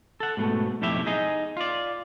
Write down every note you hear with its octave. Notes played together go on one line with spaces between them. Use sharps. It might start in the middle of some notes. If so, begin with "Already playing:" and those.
A4 F#5
G#2 B2 A3
B1 F2 A2 E4 G4 E5
D#4 G#4 D#5
F4 D5